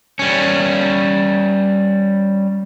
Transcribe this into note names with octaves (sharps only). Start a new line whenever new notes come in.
G3 C#4